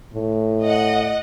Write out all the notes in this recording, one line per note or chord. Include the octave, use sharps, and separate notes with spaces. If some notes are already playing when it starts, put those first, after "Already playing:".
A2
D#5 F#5